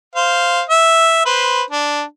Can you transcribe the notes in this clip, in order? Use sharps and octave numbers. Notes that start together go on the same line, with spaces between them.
C5 F5
E5
B4 C5
D4